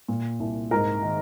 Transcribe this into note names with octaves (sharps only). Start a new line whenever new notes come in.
A#2
C2
G#2 A#4
D#3